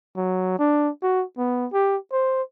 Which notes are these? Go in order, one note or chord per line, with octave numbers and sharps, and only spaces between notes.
F#3
D4
F#4
B3
G4
C5